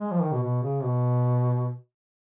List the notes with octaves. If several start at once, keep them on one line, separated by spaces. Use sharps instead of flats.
G#3
F3
D#3
B2
B2
C#3
B2